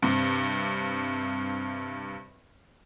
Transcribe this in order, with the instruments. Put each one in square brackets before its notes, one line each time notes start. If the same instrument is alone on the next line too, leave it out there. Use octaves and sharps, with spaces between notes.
[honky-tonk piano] G2 C3